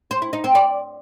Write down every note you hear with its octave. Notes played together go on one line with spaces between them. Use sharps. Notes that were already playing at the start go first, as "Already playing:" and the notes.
C5
E4
D#4
C4
D5